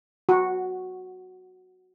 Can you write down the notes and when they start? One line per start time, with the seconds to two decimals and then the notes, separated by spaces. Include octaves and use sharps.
0.29 F#4